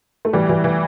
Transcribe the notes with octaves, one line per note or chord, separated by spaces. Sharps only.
A3
A2 E3 G3
E3 G3
E3